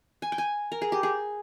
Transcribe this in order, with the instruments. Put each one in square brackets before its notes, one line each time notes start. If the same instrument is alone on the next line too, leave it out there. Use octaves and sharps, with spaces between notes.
[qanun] G#5
G5
G#5
A#4
G#4
G4
G#4